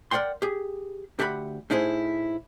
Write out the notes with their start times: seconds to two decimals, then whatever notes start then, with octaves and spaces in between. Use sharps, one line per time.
0.11 A#4 D5 F#5 G5 C6
0.42 G4 G#4
1.19 D2 G4 E5 F#5 G#5 B5
1.70 A2 D#4 E4 G#4 C5